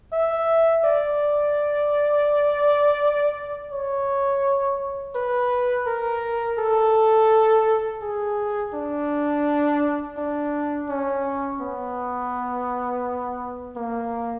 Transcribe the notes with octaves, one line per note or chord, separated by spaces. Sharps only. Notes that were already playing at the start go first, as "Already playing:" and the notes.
E5
D5
C#5
B4
A#4
A4
G#4
D4
D4
C#4
B3
A#3